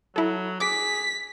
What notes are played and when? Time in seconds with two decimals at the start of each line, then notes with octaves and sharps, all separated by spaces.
0.16 F#3 E4 A4
0.60 G#4 D6 B6